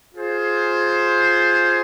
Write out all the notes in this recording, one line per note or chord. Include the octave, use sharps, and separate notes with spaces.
F4 G#4 C5